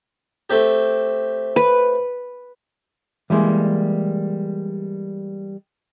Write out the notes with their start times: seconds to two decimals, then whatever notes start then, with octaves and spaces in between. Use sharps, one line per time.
0.50 A3 C4 G4
1.56 B4
3.30 E3 G3 G#3 A#3